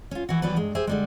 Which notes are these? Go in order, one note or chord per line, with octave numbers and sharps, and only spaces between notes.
C#4 F4
E3 E4 F#4
E3 F#3 G3 B3 B4
G2 G#3
G4 G#4 C5 E5
D3 G3 G#3